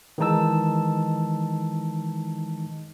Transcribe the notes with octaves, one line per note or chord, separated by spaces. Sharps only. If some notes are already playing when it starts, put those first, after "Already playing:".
D#3 E3 G#3 D#4 A5 E6